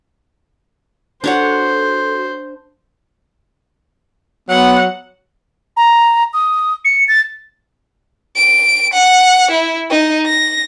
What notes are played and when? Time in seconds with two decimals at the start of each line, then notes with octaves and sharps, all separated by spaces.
1.24 D4 F#4 A4 C5 C#5 F#5
4.49 F#3 B3 F#5
5.77 A#5
6.33 D#6
6.85 C#7
7.08 A6
8.37 D7
8.93 F#5
9.51 E4
9.91 D#4
10.26 A#6